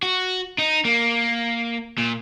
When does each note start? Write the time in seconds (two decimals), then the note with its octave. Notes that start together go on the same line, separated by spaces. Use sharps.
0.03 F#4
0.58 D#4
0.85 A#3
1.98 A#2